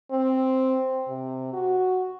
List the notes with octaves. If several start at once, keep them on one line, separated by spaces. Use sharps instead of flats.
C4
C3
F#4